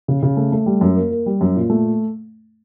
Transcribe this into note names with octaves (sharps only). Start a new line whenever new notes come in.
C#3
C#3
A3
A3
G3
F#2
A#3
A#3
G3
F#2
A#2
A3